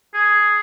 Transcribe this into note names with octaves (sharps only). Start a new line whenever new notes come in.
G#4